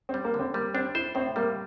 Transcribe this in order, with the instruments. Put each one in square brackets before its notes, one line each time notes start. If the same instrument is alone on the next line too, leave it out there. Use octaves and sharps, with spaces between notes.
[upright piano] C4
[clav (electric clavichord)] G3
[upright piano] A#3
[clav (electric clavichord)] D3
[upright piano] C4
[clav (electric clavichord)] G3 [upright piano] A#3
[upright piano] C4 [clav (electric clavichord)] D4
[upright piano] E4 [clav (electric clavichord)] C5
[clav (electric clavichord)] A2 [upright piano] C4
[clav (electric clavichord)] G3 [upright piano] A#3